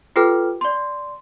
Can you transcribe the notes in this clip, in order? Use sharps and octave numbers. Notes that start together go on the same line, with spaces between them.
F4 G4 A4 B4 G5 F6
D5 C6